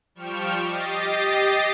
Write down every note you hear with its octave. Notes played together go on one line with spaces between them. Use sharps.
F3 G3 G5 C#6 F6 E7
G4 D#5 A6 C7